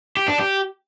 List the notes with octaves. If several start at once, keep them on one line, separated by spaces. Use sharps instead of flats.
G4
D4
G4